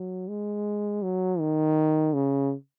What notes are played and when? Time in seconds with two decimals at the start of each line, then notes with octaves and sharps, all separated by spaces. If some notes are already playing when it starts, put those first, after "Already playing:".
Already playing: F#3
0.28 G#3
1.03 F#3
1.40 D#3
2.14 C#3